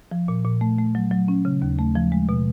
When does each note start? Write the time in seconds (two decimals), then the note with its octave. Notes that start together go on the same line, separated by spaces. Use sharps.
0.11 F3
0.28 A#2
0.45 A#2
0.61 A3
0.79 A3
0.95 F#3
1.11 F#3
1.28 C#4
1.45 C#3
1.62 D#2
1.79 A3
1.95 F3
2.12 G#3
2.29 B2